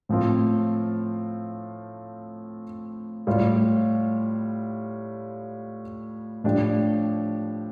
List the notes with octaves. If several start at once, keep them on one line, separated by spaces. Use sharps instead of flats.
A2 F3 C4 F4
A2 G3 F4
A2 F3 D4 G4